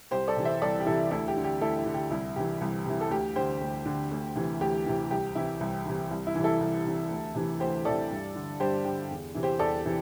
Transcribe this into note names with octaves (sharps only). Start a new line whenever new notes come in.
C2 G4 C5
A4 D5
C3 E3
C5 E5
C2 A4 D5
G4
C3 E3 E4 A4
D2 E4 A4
G4
D3
G4
D2 E4 A4
E4
D3
G4
C2 E4
C3 E3 G4
C2
C3 E3
A4
D2 G4
D3 G4 C5
D2
D3
D2
C3 E3
D2 G4
C3 E3
C2 G4
C3 E3 E4
C2
C3 E3
C2
E4
C3 E3
E4 A4
C2
C3 E3
D2
C3 E3
D2 G4 C5
C3 E3 A4 D5
G2
D3
G2 G4 C5
D3 G4
E2
C3 E3
G4 C5
E2 A4 D5
C3 E3